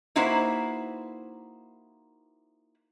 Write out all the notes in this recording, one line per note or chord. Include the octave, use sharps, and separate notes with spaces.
A#3 D#4 E4 F#4 B4 C5